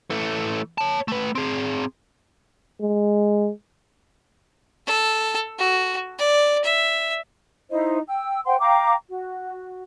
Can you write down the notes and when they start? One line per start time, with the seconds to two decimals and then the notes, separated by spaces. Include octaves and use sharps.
0.10 E3 A3
0.78 C#5 A5
1.08 A3 B4
1.35 C4 G#4
2.82 G#3
4.87 A4
5.59 F#4
6.19 D5
6.64 E5
7.70 D#4 E4 C5 D#5
8.08 G5 E6
8.46 C5 F#5 G5 C6
8.59 F5 G5 A#5 D6
9.09 F#4